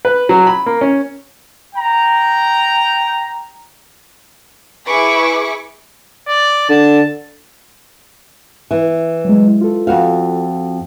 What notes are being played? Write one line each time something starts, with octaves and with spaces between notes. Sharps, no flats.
B4
F#3
B5
A#3
C#4
G5 A#5
E4 G#4 B4 C#6 D6
D5
D3 A5
E3
F#3 G#3
F4 A4
F2 F#4 F5